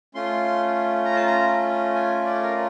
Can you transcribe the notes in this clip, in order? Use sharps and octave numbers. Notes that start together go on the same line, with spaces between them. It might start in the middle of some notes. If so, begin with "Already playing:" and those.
A3 C#4 F4 C6
A#5
A5
A#5
G#5
D5
A#4